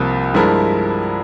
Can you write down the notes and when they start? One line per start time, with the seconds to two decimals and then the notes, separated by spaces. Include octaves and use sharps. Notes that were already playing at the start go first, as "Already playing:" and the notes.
Already playing: C2 C3 F3 A#3
0.34 G2 F3 G#3 E4 A#4